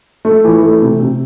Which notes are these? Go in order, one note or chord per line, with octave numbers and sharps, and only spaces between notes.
A3
E3
A3
C3
C3